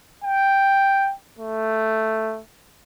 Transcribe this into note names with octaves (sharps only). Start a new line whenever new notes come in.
G5
A3